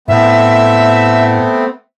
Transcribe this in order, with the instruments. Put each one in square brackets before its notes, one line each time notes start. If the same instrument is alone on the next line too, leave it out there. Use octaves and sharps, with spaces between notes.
[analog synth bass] A2 [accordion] A3 B3 C4 [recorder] E5